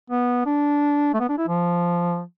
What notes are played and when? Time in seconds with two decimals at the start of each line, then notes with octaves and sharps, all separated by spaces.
0.10 B3
0.46 D4
1.14 A3
1.20 B3
1.29 D4
1.38 E4
1.48 F3